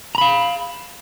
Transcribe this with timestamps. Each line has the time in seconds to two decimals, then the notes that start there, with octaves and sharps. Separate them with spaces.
0.15 A#5
0.18 B5
0.21 F5